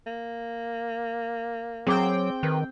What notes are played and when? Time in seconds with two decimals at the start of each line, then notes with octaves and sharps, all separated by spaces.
0.06 A#3
1.87 F#3 C4 G#4 G5 D6
2.43 D#3 B4